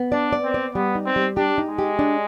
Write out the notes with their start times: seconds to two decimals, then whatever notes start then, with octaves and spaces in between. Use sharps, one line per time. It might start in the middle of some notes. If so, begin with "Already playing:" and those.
Already playing: B3
0.12 D4 D5
0.33 D5
0.44 C4
0.54 D5
0.75 G3 B3
0.95 D#4
1.06 C4
1.16 G3
1.37 D4 G4
1.58 D#4
1.69 G#3
1.79 G4
1.99 D4